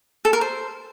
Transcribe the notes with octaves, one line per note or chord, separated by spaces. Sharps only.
A4
A#4
C5